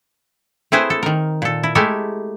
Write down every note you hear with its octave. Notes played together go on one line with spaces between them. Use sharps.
A3 C4 E4 G#4 B4 C5
A4
D#3 A#4
A#2 A4
E4
G#3 A3 E4 G4 A4 A#4